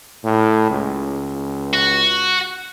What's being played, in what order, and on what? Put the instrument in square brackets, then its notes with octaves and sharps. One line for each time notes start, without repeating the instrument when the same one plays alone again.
[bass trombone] A2
C#2
[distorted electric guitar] F#4